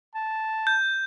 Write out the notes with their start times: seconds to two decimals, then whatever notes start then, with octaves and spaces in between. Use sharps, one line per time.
0.15 A5
0.67 G6